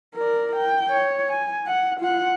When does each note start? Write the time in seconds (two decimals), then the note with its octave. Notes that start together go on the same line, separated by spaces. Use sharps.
0.16 A#4 D5
0.56 G5
0.91 C#5
1.29 G#5
1.66 F#5
2.00 F4 F#5